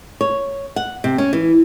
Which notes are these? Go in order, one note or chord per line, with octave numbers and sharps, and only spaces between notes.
C#5
F#5
C3
C#4
E3